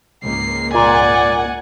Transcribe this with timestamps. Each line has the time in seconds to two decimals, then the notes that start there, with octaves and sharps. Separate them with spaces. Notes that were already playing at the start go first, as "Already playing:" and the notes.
0.24 C#2 G#2 A#3 C7
0.74 A#2 D5 F#5 G#5